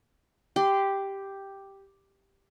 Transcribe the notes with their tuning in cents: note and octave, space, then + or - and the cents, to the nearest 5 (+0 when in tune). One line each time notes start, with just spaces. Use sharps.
G4 +0 C6 -30